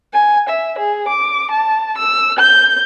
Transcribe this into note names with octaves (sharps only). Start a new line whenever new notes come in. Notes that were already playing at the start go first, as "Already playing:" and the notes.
G#5
E5
G#4
D6
A5
E6
G6